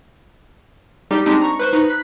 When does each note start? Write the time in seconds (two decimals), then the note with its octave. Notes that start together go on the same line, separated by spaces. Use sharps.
1.11 G3 D#4 G4
1.26 G#3 C4 D4 D#4 G4
1.42 A#5 C#6
1.59 B4 C5 C#6
1.73 D#4 B4
1.86 B5 F#6 B6